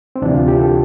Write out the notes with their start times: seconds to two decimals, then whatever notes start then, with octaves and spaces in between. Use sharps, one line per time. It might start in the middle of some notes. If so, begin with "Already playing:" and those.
0.16 C4
0.22 D2 C3 E3 D4
0.35 F4
0.48 G4
0.61 A4